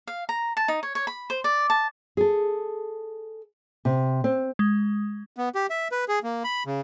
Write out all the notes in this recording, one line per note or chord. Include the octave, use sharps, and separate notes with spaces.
F5
A#5
A5
D#4
C#5
C#5
B5
C5
D5
A5
G#4 A4
C3
C4
G#3
B3
G4
E5
B4
G#4
A#3
B5
C#3